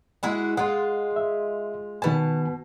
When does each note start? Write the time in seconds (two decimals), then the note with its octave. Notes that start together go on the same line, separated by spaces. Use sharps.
0.23 G#3 E4 F#4
0.57 G#3 F4 F#5
1.16 E5
2.02 B2 D#3 B4 G#5 A5